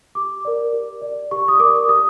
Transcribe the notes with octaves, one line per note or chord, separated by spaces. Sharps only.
G4 D6
A#4 D5
G4
A#4 D5
G4 C#6
D#6
A#4 D5 D6
G4 D#6